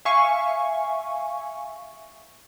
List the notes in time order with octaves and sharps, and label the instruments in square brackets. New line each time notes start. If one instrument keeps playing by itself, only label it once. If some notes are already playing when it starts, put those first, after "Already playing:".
[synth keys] E5 F5 G#5 C#6